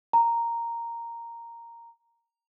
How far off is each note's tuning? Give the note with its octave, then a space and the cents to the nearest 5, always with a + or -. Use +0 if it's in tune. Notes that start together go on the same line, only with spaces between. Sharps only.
A#5 -5